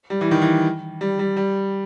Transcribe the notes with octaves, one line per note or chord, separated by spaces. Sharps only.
G3
E3
D#3
E3
G3
G3
G3